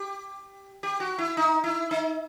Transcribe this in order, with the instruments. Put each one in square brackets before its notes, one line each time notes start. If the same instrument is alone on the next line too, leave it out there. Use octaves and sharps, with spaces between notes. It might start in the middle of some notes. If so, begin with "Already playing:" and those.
Already playing: [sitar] G4
G4
F#4
E4
D#4
E4
D#4